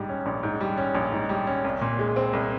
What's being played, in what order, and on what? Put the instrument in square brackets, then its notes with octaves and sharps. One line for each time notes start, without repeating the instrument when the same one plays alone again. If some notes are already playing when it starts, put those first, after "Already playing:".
Already playing: [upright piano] A#1 G#2 G3
C#4
A#1
G#2
G3
C#4
A#1
G#2
G3
C#4
C2
A#2
G#3
C4
C2